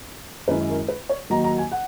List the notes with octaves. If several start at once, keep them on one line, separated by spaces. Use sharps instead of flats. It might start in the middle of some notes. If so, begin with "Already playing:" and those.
F#2 D#3 G#3 C#4 E4 B4
A#4
B4
C#5
D#2 D#3 F#3 A#5
A#5
G#5
F#5